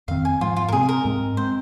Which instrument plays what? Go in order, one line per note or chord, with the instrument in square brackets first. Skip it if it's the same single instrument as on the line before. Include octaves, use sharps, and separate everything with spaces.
[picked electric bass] F2 D#3 C4 [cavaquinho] F5
[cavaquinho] G#5
[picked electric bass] G#2 F3 G#3 [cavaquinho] F4
[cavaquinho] F4
A#4
[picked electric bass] C3 G#3 C4 [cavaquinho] G#4
[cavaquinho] A#4
[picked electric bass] G#2 G#3 C4
[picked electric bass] G#3 C4 [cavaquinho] C5